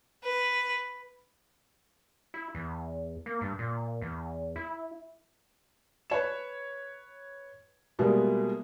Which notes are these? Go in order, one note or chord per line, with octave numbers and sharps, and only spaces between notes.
B4
E4
E2
A#3
G2
A#2
E2
E4
B4 C#5 E7
B2 G3 G#3 A#3 B3 E4